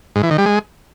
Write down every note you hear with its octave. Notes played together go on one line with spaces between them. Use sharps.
G#2
E3
D#3
G3
G#3